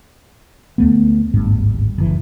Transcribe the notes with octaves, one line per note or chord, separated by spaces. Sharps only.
D2 A3 B3
D1 G#1 G2
F#1 E3